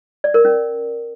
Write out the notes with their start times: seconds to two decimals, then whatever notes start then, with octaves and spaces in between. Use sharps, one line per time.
0.24 D5
0.34 A#4
0.45 C#4